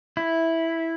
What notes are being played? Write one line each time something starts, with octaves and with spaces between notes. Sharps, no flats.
E4